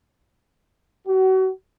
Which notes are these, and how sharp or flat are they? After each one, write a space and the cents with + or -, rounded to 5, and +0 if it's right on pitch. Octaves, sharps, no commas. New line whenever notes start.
F#4 +35